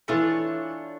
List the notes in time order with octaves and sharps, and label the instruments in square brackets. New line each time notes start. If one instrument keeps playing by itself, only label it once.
[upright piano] E3 [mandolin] A3 D4 F4 C#5